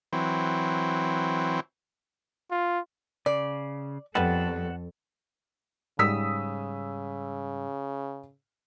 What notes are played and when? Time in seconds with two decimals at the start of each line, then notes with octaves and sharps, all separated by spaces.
0.13 E3 F#3 C4
2.51 F4
3.26 C#3 D5
4.15 F2 G3 B3 A4 F#5 A5
5.99 G#2 C#3 G3 D#6 E6 B6